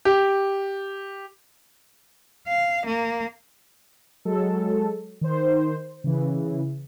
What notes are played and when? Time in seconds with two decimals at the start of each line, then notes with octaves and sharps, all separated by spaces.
0.05 G4
2.47 F5
2.86 A#3
4.25 F#3 G#3 A4
5.21 D#3 C5
6.04 C#3 E3